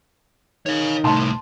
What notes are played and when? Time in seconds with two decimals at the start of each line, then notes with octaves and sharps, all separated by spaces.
0.66 D#3 C#5 F5
1.04 C2 A2 A5 C6